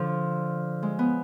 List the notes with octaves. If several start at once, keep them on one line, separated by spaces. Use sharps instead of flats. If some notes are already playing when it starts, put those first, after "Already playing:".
Already playing: D3 F3
G#3
B3